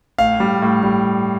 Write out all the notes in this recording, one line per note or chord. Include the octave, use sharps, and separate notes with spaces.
A2 F5
G3
A2
G3